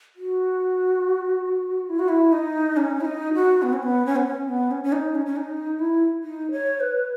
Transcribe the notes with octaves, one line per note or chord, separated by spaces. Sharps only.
F#4
E4
F#4
E4
D#4
C#4
E4
D#4
F#4
B3
C#4
B3
C#4
B3
C#4
B3
C#4
C#4
D#4
C#4
C#4
D#4
E4
D#4
C#5
B4